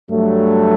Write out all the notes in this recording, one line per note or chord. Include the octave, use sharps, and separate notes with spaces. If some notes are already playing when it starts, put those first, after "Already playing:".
G2 F#3 A3